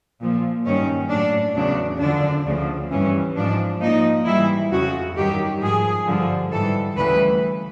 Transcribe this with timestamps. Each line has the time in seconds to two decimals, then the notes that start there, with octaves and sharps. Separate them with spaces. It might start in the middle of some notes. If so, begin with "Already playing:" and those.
0.20 A#2 F3
0.65 G2 D#3 F#3 C#4
1.10 A2 F#3 D4
1.55 E2 C#3 F#3 D4
2.00 F#2 D3 F3 D4
2.46 D2 C#3 F3
2.91 G2 E3 G3 C#4
3.36 G#2 F3 D4
3.81 A#2 F3 D#4
4.26 G#2 E3 G3 E4
4.71 F2 C#3 F3 F#4
5.17 G2 D#3 F#3 G4
5.62 G#2 F3 G#4
6.07 G2 D3 F3
6.52 G#2 E3 G3 A4
6.97 D2 C#3 E3 G3 B4